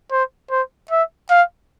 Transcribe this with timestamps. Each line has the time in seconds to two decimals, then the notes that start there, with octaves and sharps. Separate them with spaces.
0.12 C5
0.51 C5
0.91 E5
1.31 F5